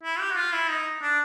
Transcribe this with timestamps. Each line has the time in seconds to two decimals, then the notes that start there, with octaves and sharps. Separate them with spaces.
0.03 E4
0.20 G4
0.31 F#4
0.36 F4
0.53 E4
0.70 D#4
1.02 D4